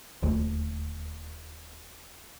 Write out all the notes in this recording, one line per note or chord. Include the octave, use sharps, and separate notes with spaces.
D#1 D2